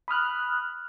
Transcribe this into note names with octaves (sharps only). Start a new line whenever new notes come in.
B5 D#6 F6 F#6